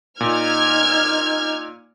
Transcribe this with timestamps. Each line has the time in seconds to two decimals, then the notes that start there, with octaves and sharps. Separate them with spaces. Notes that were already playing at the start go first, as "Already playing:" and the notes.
0.20 A#2 D#4 F6 G#6